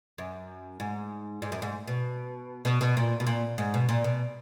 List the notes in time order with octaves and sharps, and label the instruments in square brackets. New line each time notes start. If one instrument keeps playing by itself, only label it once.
[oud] F#2
G#2
G#2
F#2
G#2
B2
B2
B2
A#2
B2
A#2
G#2
B2
A#2
B2